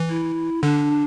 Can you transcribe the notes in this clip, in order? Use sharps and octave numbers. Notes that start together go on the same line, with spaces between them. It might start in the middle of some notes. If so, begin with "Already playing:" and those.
Already playing: E3
E4
D3 D4